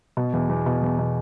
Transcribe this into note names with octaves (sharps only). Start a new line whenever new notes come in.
B2
E2
E2
B2
E2
B2